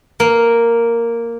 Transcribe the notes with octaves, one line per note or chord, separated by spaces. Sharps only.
A#3